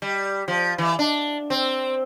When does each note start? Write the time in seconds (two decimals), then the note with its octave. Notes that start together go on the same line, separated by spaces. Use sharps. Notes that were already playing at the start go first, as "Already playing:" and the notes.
0.02 G3
0.48 F3
0.78 E3
0.99 D4
1.50 C4